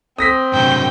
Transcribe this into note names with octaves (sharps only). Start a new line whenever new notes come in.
C4 D#6 A#6 B6
G2 C3 F#3 G5